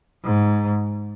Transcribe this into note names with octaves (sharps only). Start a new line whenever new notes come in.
G#2